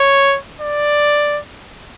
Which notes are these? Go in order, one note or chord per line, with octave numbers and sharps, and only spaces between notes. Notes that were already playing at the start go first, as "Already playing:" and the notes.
Already playing: C#5
D5